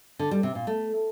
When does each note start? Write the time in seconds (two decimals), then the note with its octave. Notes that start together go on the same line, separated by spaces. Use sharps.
0.19 D3
0.31 G3
0.43 C3
0.55 A#2
0.67 A3